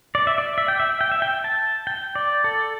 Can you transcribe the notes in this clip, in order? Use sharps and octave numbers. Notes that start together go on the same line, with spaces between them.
D5
E5
D5
E5
G5
E5
G5
E5
G5
A5
G5
D5
A4